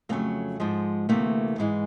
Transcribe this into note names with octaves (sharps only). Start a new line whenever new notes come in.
F2 C#3 F#3 A3 A#3
G#2 F3 G#3
D2 C3 E3 A3 A#3
G#2 E3 G#3